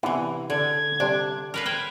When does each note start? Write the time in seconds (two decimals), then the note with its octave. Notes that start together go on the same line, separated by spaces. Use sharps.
0.03 C3 E3 B3 D4 E4
0.50 D3 G#6
1.00 C3 G3 D4
1.54 A#4 B4 F5 F6
1.66 B4 C5 G5 G#6